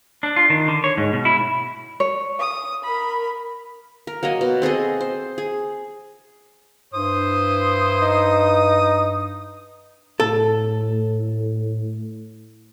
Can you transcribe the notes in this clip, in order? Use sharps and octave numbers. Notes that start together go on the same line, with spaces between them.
D4
F4
D#3
D3
C#5
G#2
B2
E4
C#5
D#6
A#4 B5
A#4
F#3 A#3 C#5 D#5
B2
C4 G#4 A4 D#5
C5
G#4
G2 E4 C5 D#6
D#4
A2 A4